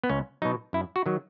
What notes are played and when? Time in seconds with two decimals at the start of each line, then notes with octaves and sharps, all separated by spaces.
0.04 B3
0.09 C#2 C#4
0.42 B2 F#3 D#4
0.73 F#2 E4
0.96 F#4
1.06 D#3 F#3